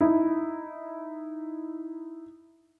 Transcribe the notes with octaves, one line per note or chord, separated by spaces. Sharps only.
D#4 E4